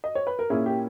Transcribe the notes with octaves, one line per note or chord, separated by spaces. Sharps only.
D#5
C#5
B4
A#4
A#2 A#3 C#4 E4 G#4
G4